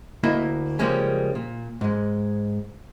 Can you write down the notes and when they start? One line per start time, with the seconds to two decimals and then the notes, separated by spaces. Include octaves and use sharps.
0.24 D2 A#3 E4 D#5 E5
0.79 C#3 F3 G3 G#3 A#3 C#4
1.35 A#2
1.81 G#2 G#3